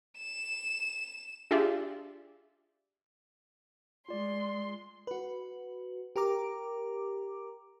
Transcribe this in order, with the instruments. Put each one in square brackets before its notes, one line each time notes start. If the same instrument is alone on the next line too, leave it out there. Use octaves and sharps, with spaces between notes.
[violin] E7
[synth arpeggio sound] D4 F4 G4 G#4 D5 E5
[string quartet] G#3 C6 [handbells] F4 D5
[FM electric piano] F#4 B4
G4 A#4 A#5 D6